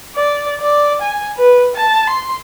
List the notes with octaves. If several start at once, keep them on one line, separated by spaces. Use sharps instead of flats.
D5
D5
G#5
B4
A5
C6